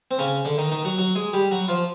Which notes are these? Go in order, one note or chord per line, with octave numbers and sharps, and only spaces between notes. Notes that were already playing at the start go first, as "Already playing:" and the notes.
C4
C#3 C#4
D3 D4
D#3 D#4
D#3 D#4
F#3 F#4
F#3 F#4
G#3 G#4
G3 G4
F#3 F#4
F3 F4